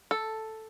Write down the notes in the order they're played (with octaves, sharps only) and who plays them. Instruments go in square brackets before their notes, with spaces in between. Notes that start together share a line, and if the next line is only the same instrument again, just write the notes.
[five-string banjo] A4